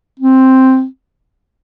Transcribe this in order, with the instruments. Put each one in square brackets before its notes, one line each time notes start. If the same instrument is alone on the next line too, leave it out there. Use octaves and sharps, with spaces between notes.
[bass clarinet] C4